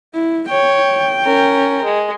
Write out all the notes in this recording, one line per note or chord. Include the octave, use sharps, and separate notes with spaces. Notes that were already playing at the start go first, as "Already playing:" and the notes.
E4
C#5 G5
C#4 A#4
G#3